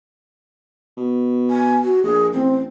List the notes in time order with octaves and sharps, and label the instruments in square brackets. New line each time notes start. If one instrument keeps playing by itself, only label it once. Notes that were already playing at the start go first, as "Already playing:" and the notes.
[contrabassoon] B2
[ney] G#5
F#4
[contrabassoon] A#1 [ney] G#4
[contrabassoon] A1 [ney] C4